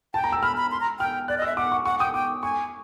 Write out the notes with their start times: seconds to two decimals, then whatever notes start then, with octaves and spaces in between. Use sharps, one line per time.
0.14 G5 A5
0.24 A#5
0.32 E6
0.42 B5 F6
0.57 B5
0.71 C6
0.80 A#5
0.99 G5 F6
1.28 D5 F#6
1.38 D#5
1.42 E5 E6
1.57 F#5 D6
1.72 C#6
1.85 F#5 C#6
1.99 G5 D#6
2.14 G5 D6
2.43 G#5 C#6